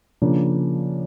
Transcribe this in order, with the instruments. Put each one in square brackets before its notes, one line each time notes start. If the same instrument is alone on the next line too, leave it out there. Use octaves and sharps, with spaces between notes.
[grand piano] C#3 F3 A#3 D4